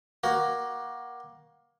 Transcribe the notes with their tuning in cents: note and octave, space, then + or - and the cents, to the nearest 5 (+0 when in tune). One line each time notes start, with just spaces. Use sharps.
A#3 +20 F#4 +15